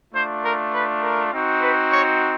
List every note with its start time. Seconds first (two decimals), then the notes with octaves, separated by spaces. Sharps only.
0.13 A3 D4 F4 C5
0.43 A#4
0.73 B4
1.02 A#4
1.32 C4 D#4 F#4
1.61 B4
1.91 C#5